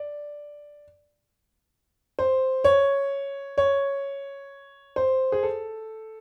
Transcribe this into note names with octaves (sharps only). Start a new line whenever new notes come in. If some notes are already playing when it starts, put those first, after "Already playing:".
Already playing: D5
C5
C#5
C#5
C5
G#4
A4